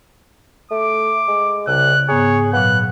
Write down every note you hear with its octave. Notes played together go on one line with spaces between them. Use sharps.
A3 D6
G#3
C2 C#3 F#6
G#2 B3 G#4 C#5 A#5
A#2 F#3 B3 F5 F#6